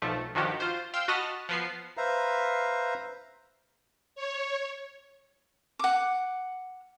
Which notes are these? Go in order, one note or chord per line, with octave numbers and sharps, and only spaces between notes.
B1 F3 A3
G2 D#3 F3 F#4 G4
F4 C5
F5 G5 C6 E6
F#4 D#5 A5 B5 D#6 F6
F3 B3 C7
B4 C5 E5 F5 A#5
C#5
F#5 D6